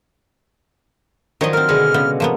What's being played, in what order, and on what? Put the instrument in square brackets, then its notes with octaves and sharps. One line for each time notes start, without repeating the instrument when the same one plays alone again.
[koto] D#3 C#5 D#5 [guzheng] F3 F#3 D4
[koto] C4 A#4 [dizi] F6
[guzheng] B2 D3 G#3
[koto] C#3 B3
F3 A#3 B3